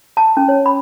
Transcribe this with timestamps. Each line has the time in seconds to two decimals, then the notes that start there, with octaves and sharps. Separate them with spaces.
0.17 A5
0.37 C#4
0.49 C#5
0.66 B5